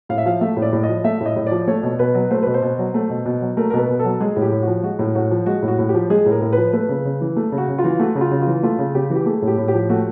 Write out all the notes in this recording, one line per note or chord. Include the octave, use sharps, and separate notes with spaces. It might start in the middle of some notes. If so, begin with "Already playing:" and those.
A2 F5
E5
F3 F5
A3 E5
A2
D5
A2
F3 D#5
A3 E5
A2
D#5
A2
F3 D5
A3 C#5
B2
B2 B4
F#3
A3 C5
B2 B4
C5
B2
F#3
A3
B2
B2
F#3
A3 A#4
A#4
B2 B4
B2
A4
F#3
G#3 G#4
A2
G4
A2
F#4
F3
G#3 F#4
A2
A2 F#4
F3
G#3 F#4
A2
F#4
A2
G4
F3
G#3 G#4
A2 A#4
A2
F3 B4
A3 B4
C#3
C#3
E3
A3
C#3
F#4
C#3
F4
E3
A3 F#4
C#3
F4
C#3
F4
E3
A3 F4
C#3
C#3 G4
E3 G4
A3 G#4
A2
G4
A2
G4
F3
A3 F#4